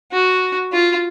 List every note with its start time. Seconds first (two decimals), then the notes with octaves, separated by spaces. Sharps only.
0.12 F#4
0.73 F4